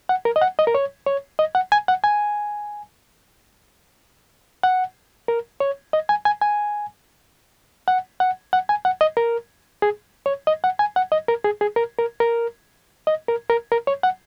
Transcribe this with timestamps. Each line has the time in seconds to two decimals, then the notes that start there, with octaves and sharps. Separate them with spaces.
0.09 F#5
0.25 A#4
0.36 D#5
0.41 F#5
0.59 D#5
0.67 A#4
0.75 C#5
1.06 C#5
1.39 D#5
1.55 F#5
1.72 G#5
1.88 F#5
2.04 G#5
4.63 F#5
5.28 A#4
5.60 C#5
5.93 D#5
6.09 G#5
6.25 G#5
6.41 G#5
7.88 F#5
8.20 F#5
8.53 F#5
8.69 G#5
8.85 F#5
9.01 D#5
9.17 A#4
9.82 G#4
10.26 C#5
10.47 D#5
10.64 F#5
10.79 G#5
10.96 F#5
11.12 D#5
11.28 A#4
11.45 G#4
11.61 G#4
11.76 A#4
11.98 A#4
12.20 A#4
13.07 D#5
13.28 A#4
13.50 A#4
13.72 A#4
13.87 C#5
14.03 F#5